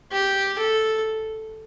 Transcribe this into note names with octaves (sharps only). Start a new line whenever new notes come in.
G4
A4